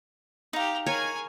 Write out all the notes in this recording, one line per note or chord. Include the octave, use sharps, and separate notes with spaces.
D#4 G4 F5 A#5
G#4 A#4 C#5 G#5